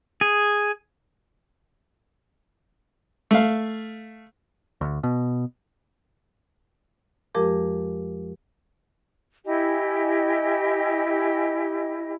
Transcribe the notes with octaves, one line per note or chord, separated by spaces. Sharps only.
G#4
A3 F5
D2
B2
F2 F3 G#3 G4 A#4 D6
E4 G4 D#5 G#5